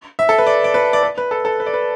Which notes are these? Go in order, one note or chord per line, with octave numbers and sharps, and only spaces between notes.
E5
A4
B4
D5
D5
B4
D5
B4
B4
A4
A4
B4
D5
B4